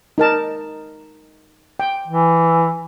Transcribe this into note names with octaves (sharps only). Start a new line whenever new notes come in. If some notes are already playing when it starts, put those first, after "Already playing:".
D#4 A#4 A5
G5
E3